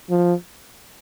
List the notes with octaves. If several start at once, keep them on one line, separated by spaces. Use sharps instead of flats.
F3